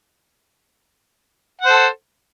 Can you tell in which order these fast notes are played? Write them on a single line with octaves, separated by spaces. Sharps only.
F#5 C5 A4